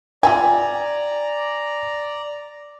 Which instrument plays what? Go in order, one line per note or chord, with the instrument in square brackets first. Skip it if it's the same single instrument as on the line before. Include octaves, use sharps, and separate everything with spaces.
[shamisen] F4 E5 G5 [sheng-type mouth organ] D5 A#5 [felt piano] G#5